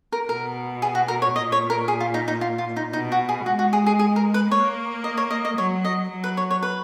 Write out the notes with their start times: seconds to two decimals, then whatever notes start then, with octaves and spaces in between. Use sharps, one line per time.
0.12 A#4
0.29 B2 A#4
0.82 G#4
0.95 F#4
1.08 A#4
1.22 C#5
1.35 A#2 D#5
1.52 C#5
1.70 A#4
1.88 G#4
2.00 F4
2.14 D#4
2.28 D#4
2.41 F4
2.58 F4
2.76 D#4
2.93 B2 D#4
3.12 F#4
3.29 G#4
3.46 G#3 F#4
3.59 F#4
3.73 G#4
3.86 G#4
3.99 G#4
4.16 A#4
4.34 B4
4.51 A#3 C#5
5.04 D#5
5.17 C#5
5.31 D#5
5.45 D#5
5.57 F#3 C#5
5.85 D#5
6.10 F#3
6.24 B4
6.37 C#5
6.51 C#5
6.63 B4